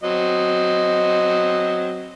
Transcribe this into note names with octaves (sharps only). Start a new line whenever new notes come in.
F#3 C4 D#5